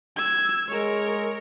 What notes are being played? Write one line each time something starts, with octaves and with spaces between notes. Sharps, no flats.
E6 G#6
G#3 A#4 C#5